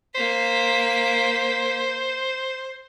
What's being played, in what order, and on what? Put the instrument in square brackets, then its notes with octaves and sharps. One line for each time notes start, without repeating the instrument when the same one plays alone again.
[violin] A#3 B6 [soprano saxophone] C5